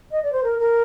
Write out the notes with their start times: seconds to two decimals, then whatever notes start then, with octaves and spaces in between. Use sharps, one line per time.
0.11 D#5
0.23 D5
0.32 C5
0.43 A#4
0.59 A#4